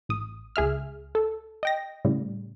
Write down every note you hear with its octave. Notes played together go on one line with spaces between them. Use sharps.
A1 D#6
C#2 G#4 E5 F6
A4
D#5 G5 A#6
A2 C#3 G3